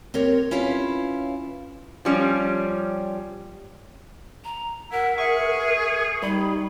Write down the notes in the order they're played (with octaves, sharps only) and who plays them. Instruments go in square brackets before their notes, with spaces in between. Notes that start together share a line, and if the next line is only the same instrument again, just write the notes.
[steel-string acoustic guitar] C4 G4 A#4 C#5
C#4 E4 F4 B4 C#5 F5
[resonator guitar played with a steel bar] F3 G3 C#4
[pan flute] A#5
[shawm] E4 [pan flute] A#4 [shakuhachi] F#5
[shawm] G#4 [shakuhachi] E5 [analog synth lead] C#6
[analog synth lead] G3 [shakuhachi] D#4 [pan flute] B5